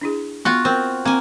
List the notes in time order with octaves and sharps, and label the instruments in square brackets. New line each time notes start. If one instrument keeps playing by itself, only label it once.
[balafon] D4 E4 G#4
[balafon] B3 [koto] F4 F#4
[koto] C4 [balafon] A#4
[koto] A#3 G#5 [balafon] C4